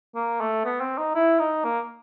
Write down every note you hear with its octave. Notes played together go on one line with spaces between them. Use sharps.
A#3
A3
B3
C4
D#4
E4
D#4
A#3